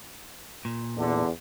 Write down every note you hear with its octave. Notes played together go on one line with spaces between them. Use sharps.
A#2
E2 D3